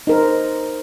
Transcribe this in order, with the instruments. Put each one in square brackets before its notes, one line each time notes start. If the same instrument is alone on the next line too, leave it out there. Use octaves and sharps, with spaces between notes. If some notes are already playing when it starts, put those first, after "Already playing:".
[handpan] D#4 A#4 C5